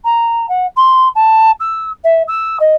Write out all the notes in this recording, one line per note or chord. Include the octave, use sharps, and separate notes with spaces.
A#5
F#5
C6
A5
E6
E5
E6
D#5